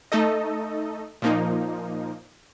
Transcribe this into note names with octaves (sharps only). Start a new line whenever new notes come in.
A3 D#4 A4 D#5
A#2 F3 A#3 D#4